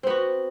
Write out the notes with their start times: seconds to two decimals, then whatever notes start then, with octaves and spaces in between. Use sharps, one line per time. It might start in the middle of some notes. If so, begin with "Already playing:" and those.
0.03 C4
0.07 B3
0.10 F#4